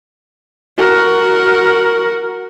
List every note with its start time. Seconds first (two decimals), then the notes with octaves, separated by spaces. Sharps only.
0.77 F#4 A#4